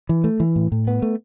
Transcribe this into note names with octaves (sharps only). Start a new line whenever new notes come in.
E3
A3
E3
A2
A2
B3
A3